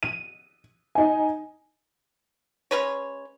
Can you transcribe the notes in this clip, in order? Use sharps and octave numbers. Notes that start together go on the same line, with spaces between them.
D#7
D#4 G#5
G#3 C#4 B4 C#5